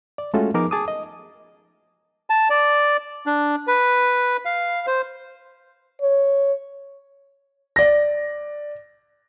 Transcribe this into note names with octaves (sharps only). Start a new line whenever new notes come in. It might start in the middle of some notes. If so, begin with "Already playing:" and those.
D5
G#3 A3 C#4 F4 F#4 A4
F3 B3 D#4 G#4 A#4 D6
G#4 A5 D6 D#6
D#5
A5
D5
D4
B4
F5
C5
C#5
D5 A#6